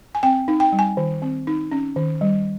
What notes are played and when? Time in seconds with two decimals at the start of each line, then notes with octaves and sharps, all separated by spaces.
0.15 G#5
0.23 C4 G5
0.48 D#4
0.60 G5
0.72 G3
0.79 G#5
0.97 D#3
1.22 C4
1.47 D#4
1.71 C#4
1.96 D#3
2.21 G3